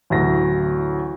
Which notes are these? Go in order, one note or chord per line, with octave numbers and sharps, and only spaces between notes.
A1 D2 F#3 A#6